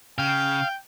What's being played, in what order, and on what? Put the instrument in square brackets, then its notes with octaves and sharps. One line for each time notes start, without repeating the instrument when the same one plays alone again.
[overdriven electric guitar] C#3 [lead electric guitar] F5 [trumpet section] G5